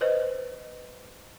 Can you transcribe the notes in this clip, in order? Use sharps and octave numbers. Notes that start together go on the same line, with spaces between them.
B4 C5 D#5